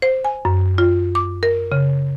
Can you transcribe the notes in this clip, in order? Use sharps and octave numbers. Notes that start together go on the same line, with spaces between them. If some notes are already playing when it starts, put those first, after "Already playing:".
C5
G#5
F#2
F4
D6
A#4
C#3